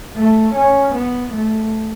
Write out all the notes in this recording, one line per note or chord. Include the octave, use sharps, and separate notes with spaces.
A3
C#4
B3
A3